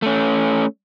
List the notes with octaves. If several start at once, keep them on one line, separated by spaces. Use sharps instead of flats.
A3 C#4